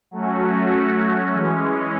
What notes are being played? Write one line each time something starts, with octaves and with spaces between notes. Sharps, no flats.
F#3 A3 C#4 F#4
E3 G#3 C#4